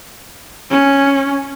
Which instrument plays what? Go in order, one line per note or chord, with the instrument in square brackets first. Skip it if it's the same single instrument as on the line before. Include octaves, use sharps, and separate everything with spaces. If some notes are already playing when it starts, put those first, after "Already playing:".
[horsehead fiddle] C#4